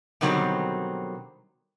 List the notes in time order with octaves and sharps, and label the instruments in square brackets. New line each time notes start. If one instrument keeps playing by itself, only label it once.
[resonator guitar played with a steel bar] B2 D3 D#3 F#3 G3 C4